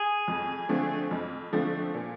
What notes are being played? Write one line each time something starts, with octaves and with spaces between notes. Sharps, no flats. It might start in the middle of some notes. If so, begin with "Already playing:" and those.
Already playing: G#4
F2
D3 F3 A3 C4
F2
D3 F3 A3 C4
A#2